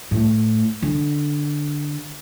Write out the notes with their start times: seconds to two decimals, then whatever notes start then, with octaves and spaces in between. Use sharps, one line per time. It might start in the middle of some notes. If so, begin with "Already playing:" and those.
0.11 A2
0.82 D3